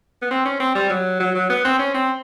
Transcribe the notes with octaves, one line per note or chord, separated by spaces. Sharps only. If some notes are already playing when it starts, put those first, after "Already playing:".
B3
C4
C#4
C4
G3
F#3
F#3
F#3
B3
C4
C#4
C4